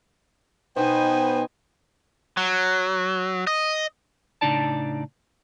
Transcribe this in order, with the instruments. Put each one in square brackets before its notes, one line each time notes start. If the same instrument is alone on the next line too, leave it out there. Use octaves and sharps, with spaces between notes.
[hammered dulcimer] B2 [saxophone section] B3 C5 [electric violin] D#4 G#5 [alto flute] G5
[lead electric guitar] F#3
D#5
[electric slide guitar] A2 C#3 D4 D#4 D5 A5